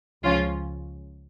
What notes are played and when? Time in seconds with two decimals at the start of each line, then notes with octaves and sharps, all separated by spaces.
0.24 C#2 C#3 F3 C#4 F4